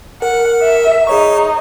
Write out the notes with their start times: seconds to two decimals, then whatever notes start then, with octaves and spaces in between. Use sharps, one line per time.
0.22 A#4 F#5
0.63 E5
1.07 D#4 G#4 C#5 C#6